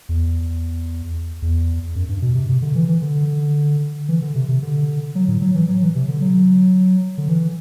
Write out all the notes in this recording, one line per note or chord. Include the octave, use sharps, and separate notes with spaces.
E2
E2
F#2
G2
B2
C3
C3
D3
E3
E3
D3
E3
D3
C3
C3
D3
F#3
A2
F#3
E3
F#3
E3
C3
D3
F#3
D3
E3